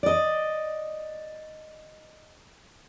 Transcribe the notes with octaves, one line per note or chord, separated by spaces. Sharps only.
D5 D#5